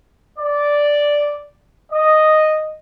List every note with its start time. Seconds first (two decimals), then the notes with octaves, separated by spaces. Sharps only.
0.39 D5
1.92 D#5